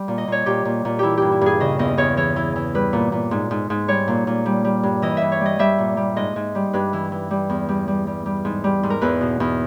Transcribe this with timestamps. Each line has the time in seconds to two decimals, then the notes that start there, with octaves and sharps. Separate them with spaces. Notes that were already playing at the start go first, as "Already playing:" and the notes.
Already playing: G3
0.08 A#2
0.18 D#5
0.28 A#2 C#5
0.46 A#2 G4
0.65 A#2
0.85 A#2
0.99 E3 E4 G4
1.18 G2 G4
1.32 E4
1.41 G2 G#4
1.60 C#3 D#5
1.79 E2 D#5
1.97 E2 C#5
2.17 E3 C#5
2.36 E3
2.56 E3
2.75 G3 B4
2.93 A#2
3.12 A#2
3.31 G#2
3.51 G#2
3.70 G#2
3.88 G3 C#5
4.08 A#2
4.27 A#2
4.46 G3
4.65 G3
4.83 G2
5.02 E3 D#5
5.17 G2 E5
5.32 C#5
5.41 G3
5.46 D#5
5.59 G3 E5
5.78 A#2
5.97 G3
6.16 G#2 D#5
6.36 G#2
6.55 G3
6.73 G2 B4
6.93 E3
7.12 E3
7.31 G3
7.50 E2
7.69 G3
7.88 G3
8.07 G3
8.26 G3
8.45 G#2
8.64 G3
8.83 G#2
8.90 A#4
9.02 E2 B4
9.21 B2
9.40 E2